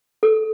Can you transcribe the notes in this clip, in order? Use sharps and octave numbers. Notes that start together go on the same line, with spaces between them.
A4